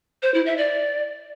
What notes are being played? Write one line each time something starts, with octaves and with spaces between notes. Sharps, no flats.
C5
E4
E5
D5